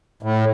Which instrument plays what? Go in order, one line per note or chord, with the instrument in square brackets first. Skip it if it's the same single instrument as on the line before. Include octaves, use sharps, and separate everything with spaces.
[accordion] A2